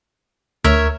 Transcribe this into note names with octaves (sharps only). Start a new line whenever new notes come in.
D2 A#4 C#5 E5